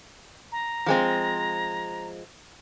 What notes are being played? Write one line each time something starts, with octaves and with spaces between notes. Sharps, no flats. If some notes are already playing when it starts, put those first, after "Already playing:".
A#5
F3 G#3 C4